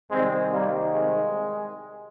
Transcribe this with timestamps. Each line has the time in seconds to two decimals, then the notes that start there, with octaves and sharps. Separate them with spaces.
0.11 C2 C3 D#3 G3 G#3 C4
0.51 G3 A#3
0.92 G#3